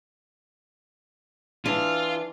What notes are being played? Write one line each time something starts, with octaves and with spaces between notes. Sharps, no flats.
E3 D4 F4